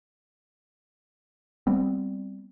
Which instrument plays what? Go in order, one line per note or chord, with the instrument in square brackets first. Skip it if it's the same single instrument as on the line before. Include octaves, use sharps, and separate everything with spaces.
[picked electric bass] G3 B3 C4